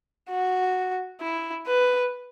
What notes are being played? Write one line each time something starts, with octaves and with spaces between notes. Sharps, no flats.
F#4
E4
B4